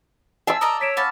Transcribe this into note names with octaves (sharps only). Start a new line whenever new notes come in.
E4 F4 G#4 A5 E6
A#4 D5 D#5 A#5
C#5 B6 D7 E7
C#4 F5 F#5 A5 B5 D6